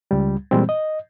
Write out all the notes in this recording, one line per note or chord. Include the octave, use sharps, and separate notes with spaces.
C#2 G3
A#2 E3 G3 G#3 C4
D#5